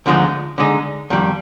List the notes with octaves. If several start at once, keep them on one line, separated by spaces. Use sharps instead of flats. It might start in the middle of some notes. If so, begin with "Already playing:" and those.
D2 D3 F3 G#3 D#4
D3 G#3 D#4
F2 D#3 G3